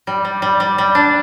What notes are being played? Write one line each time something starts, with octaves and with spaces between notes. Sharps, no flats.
G3
G3
G3
G3
G3
D4